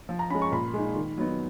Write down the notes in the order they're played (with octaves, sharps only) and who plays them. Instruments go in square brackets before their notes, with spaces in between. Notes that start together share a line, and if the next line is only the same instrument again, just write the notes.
[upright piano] F3
A#5
C#4 B5
G#3
C#6
A#2 B5
G#3 D#4
D#3
F#3 B3 D#4